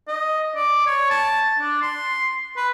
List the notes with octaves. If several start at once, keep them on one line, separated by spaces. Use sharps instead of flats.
D#5
D5
C#5
A5
D4
C6
B4